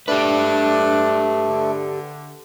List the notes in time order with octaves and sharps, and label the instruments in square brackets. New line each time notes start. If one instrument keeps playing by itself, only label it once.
[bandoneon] A3 [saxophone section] D4 [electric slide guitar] G4 B4
[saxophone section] D3